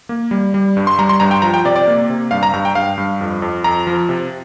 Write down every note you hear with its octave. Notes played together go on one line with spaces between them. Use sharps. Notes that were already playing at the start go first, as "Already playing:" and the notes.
A#3
G3
G3
G2
C6
G3 A#5
C6
G2 A#5
G5
F3 A#5
G5
C3 D5
D5
A#3
C3
G2 F5
A#5
G2 A#5
G5
G2 F5
G2
F2
F2
F2 A#5
F3
C3